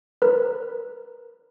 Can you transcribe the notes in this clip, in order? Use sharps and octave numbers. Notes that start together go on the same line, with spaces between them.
A#4 B4